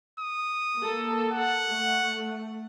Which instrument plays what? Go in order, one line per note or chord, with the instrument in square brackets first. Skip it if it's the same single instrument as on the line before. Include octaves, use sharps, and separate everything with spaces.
[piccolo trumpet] D#6
[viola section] A#3 A4
[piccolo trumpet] F#5
[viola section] A3